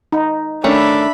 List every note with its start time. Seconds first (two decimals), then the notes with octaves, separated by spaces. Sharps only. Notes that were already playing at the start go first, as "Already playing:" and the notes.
0.12 D#4
0.64 D#3 A3 C#4 D4 E5 B5